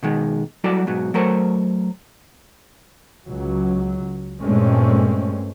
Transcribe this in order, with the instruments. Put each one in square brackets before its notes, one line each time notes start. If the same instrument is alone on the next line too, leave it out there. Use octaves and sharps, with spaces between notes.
[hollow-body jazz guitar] B2 D#3 G#3
F#3 G3 E4 F#4 A4 D5
G#2 B2 F#3
F#3 A3 A#4 C5 C#5
[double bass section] C#2 F#3
G2 A#2 G#3 A3 C4 C#4